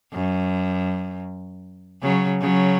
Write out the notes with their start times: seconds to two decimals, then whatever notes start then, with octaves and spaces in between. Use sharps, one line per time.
0.13 F#2
2.02 C#3 F#3
2.41 C#3 F#3